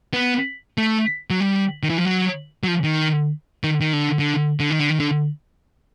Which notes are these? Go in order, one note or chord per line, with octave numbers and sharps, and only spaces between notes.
B3
A3
F#3
G3
D#3
E3
F3
F#3
F#3
F3
D#3
D#3
D#3
D3
D3
D3
D#3
D3
D#3
D3